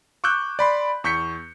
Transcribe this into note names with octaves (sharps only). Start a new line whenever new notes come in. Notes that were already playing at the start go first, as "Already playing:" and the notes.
C#6 D6 E6 F#6 G6
D5 B5 C6
E2 C#6 G6 B6 C#7